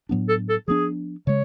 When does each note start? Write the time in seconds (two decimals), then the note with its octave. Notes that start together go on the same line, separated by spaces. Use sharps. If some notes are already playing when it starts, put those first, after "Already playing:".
0.09 A2 F#3 B3 D4
0.29 A4
0.49 A4
0.68 F3 B3 D4 G#4
1.27 C#3 G#3 C#5